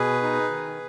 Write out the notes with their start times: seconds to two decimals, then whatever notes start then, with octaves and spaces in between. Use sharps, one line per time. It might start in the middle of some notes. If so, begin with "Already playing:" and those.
Already playing: B2 G#4 B4
0.22 D#4
0.51 D#3